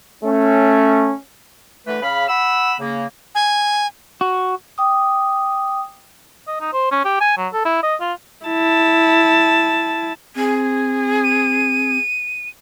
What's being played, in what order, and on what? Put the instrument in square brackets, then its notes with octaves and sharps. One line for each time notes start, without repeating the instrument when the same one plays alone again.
[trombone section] A3 C#4
[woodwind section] D3 E3 A3 B4
C#3 F5 B5
F#5 B5 E6
C#3 A#3
[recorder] G#5
[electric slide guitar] F#4
[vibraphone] G5 D6 D#6
[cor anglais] D#5
D#4
C5
C#4
G4
G#5
F#3
A4
E4
D#5
F4
[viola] E4 A5
[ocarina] C4 [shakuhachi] G#4
[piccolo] D#7